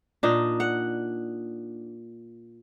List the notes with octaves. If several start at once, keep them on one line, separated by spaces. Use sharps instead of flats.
A#2 D4 D#4
F#5